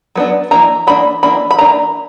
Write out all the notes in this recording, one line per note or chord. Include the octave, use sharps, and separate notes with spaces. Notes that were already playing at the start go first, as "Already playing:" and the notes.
F#3 B3 D4
E3 A#3 D4 A#5
E3 A#3 D4 B5
E3 A#3 D4 B5
B5
E3 A#3 D4 A#5